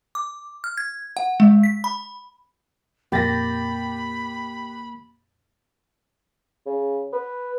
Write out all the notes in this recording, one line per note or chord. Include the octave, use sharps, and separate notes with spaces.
D6
F6
G#6
F#5
G#3
B6
B5
F2 A#2 F3 A#3 G4 B5 A6 A#6
C#3
B4